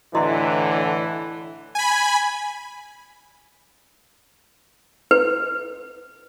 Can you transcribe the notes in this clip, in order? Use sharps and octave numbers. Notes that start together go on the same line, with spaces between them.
A2 D3 E3 E4 D#5 C6
G#5 B5
B4